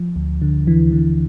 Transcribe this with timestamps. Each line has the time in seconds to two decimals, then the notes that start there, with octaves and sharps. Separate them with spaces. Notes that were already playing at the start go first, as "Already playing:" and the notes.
Already playing: F3
0.16 D2
0.42 D3
0.67 D2 E3
0.93 D3